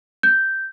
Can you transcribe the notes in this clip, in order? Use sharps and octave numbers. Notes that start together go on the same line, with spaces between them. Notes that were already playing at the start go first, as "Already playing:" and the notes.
G6